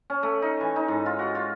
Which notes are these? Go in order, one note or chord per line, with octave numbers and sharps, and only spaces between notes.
C#4
A3
D#4
E3
D#4
G#2
F4
F#4
F4